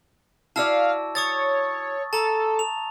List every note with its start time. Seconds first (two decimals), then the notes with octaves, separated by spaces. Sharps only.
0.56 E4 F#4 D5 F5 A5 E6
1.15 C#5 C#6 D#6 A6
2.13 A4 A5 A#5
2.59 F7